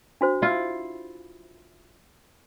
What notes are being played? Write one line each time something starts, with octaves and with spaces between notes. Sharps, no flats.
D4 F#4 C5
E4 F4